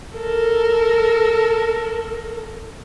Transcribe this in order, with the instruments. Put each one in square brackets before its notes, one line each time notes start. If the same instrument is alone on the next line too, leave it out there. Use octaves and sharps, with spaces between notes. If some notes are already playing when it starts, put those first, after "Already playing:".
[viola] A4 A#4